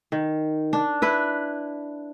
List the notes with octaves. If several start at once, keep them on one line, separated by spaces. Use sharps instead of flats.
D#3
D4
E4 B4